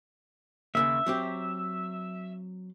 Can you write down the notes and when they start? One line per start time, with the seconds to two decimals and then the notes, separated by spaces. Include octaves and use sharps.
0.75 D#2 C#3 A#3 E5
1.06 F#3 C4 G4